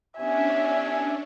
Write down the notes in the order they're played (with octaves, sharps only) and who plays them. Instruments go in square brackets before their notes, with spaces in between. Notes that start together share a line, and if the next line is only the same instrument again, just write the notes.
[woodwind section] C2 B3 G#5 [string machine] C#4 D4 [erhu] E5